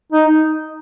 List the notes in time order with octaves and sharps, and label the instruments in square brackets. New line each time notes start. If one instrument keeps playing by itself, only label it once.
[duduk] D#4